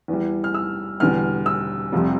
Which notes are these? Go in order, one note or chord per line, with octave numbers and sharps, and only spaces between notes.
E2 E3 G3
F6
E6
E1 E2 D3 G3 F6
E6
F1 F2 C3 G3